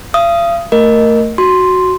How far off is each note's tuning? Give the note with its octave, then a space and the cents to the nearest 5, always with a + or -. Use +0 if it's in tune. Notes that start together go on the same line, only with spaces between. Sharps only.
F5 -40 D#6 +5
A3 +20 A#4 +0 D#5 +0
F#4 +0 C6 +0